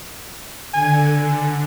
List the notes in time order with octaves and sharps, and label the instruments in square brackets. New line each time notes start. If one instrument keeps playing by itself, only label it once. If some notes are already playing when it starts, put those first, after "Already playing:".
[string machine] D3 [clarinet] G#5